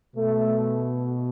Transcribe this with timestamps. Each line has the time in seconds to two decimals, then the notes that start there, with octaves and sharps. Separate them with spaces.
0.15 B2 A3